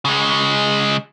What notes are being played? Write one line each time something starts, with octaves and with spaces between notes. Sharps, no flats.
C#3 G#3